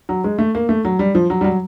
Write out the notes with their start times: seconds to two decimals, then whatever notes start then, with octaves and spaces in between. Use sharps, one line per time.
0.09 F#3
0.24 G#3
0.38 A3
0.55 A#3
0.69 A3
0.85 F#3
0.99 G3
1.15 F3
1.30 F#3
1.41 G3
1.44 F#3